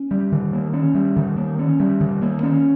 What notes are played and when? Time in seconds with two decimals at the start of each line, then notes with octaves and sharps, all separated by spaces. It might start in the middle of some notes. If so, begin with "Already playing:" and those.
Already playing: C#4
0.11 G3
0.32 D#3
0.53 A#3
0.73 C#4
0.95 G3
1.16 D#3
1.37 A#3
1.59 C#4
1.80 G3
2.00 D#3
2.22 A#3
2.43 C#4